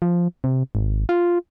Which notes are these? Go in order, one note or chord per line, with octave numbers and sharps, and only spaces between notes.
F3
C3
G#1
F4